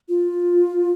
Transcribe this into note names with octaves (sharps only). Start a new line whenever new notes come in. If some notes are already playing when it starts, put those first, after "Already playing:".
F4